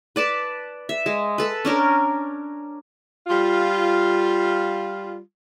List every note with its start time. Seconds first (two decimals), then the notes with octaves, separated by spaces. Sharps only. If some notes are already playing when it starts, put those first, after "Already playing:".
0.16 B4 D5 A5
0.89 E5
1.06 G#3
1.38 A4 B4
1.65 C#4 D4 A#4
3.27 G3 F4